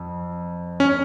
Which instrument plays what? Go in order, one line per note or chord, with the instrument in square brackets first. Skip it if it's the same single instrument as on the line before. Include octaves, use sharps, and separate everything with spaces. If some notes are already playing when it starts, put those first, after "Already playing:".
Already playing: [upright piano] F2
[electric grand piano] C#4